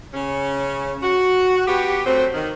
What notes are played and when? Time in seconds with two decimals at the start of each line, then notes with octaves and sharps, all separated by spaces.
0.13 C#3 C#4
1.02 F#4
1.67 B3 F#4 G4
2.06 F#3 A3 C4
2.34 D#3